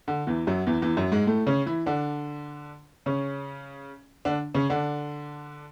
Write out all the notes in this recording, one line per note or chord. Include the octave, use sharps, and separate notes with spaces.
D3
E2 E3
F#2 F#3
E2 E3
E2 E3
F#2 F#3
G#2 G#3
A2 A3
C#3 C#4
E3 E4
D3 D4
C#3 C#4
D3 D4
C#3 C#4
D3 D4